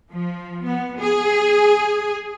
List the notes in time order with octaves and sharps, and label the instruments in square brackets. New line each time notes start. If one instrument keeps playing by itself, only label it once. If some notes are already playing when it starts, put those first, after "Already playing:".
[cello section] F3
B3
G#4